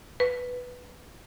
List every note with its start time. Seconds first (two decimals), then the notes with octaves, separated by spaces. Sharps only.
0.20 B4